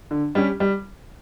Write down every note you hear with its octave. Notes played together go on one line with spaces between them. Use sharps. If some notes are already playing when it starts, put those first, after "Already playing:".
D3
G3 C#4 G4
G3